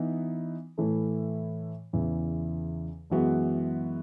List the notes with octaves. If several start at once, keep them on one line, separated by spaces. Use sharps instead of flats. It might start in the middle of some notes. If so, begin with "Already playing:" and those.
Already playing: E3 B3 D#4
A2 E3 A3 E4 A4
E2 C#3 E3
F#2 E3 G#3 B3 F#4